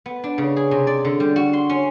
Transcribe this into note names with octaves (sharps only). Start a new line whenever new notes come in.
B3
D4
C#3
G#4
C3
D5
D3
G3
F#4
C6
C#4